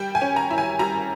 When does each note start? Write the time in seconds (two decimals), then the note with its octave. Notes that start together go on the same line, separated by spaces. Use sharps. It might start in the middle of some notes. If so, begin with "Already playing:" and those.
Already playing: G3 G5
0.15 G#5
0.22 C#4
0.36 A#5
0.51 E4
0.58 G#5
0.79 G3 A#5